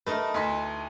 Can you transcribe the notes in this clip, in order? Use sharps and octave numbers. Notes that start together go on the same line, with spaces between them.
A3 D#4 A#4 B4 D#5 E5
D2 D#4 E4 B4 C6